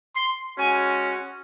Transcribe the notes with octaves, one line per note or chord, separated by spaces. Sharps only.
C6
G#3 C#4 F#4 G#5